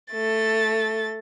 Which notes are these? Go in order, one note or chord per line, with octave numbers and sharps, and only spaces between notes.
A3 A6